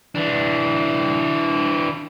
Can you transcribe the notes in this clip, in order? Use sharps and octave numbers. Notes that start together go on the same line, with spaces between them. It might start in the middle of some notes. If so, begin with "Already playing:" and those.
E3 D4